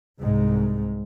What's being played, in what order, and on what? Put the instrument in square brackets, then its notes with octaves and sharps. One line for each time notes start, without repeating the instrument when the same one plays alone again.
[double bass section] C2 G#2